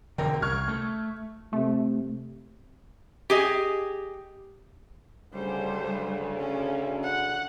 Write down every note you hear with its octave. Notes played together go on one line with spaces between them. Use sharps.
E1 D3 A#4 G5
C2 C#6 F6 G#6
A3
C3 A3
G4 G#4 D#5
D2 C#3 G3 C5
C#4
F#5